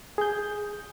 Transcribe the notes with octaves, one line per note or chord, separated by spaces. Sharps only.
G#4 G6